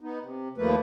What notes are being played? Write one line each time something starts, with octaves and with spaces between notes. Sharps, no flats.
B3 D#4
C3
D#2 F3 A3 A#3 B4